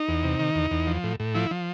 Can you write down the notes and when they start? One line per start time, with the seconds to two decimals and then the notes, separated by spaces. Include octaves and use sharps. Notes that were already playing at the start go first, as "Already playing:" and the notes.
Already playing: D#4
0.09 E2
0.24 C3
0.39 D#3
0.55 E2
0.71 E2
0.87 F3
1.04 A2
1.20 A2
1.35 F3 E4
1.51 F3